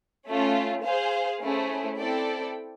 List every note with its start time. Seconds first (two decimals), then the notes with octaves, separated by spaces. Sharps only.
0.28 A3 C#4 F4
0.84 G#4 C5 F5
1.41 A3 C#4 E4 G#4 C5
1.97 C4 E4 A4 D5 G5